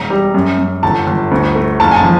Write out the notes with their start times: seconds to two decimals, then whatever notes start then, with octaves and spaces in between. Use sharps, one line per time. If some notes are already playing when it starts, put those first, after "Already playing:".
Already playing: E1 A#5
0.10 G3
0.34 F#2
0.58 F#2
0.83 G1 A5
1.07 G1
1.31 D2
1.55 A3
1.80 F#1 A5
1.91 G#5
1.96 A5
2.04 F3